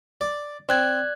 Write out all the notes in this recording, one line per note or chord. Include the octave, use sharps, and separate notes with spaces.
D5
C4 D5 F#6 G#6